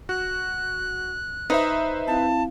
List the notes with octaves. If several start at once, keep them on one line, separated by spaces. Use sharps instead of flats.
F#4 F#6
D#4 B4 C5 E5
C4 E4 F5 A5